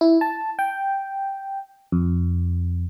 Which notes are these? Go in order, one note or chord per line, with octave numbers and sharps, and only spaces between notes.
E4
A5
G5
F2